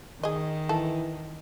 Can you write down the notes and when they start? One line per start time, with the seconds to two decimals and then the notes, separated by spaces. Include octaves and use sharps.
0.23 D#3 G#4 D#5
0.69 E3 A4